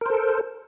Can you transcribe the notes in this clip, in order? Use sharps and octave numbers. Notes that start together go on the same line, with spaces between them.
A4 A#4 C5